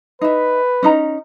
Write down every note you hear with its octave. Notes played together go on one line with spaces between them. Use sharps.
D#4 B4 E5
C#4 D#4 A#5